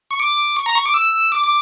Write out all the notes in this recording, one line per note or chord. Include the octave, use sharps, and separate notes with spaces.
C#6
D6
C#6
A#5
C#6
D6
E6
D6
D6